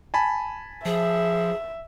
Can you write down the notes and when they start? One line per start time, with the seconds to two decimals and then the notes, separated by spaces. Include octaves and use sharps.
0.14 G#5 A5 B5
0.85 F3 G#4 E5